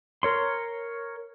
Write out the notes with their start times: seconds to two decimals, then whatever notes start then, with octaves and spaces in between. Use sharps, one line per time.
0.23 A#4 C#5 C6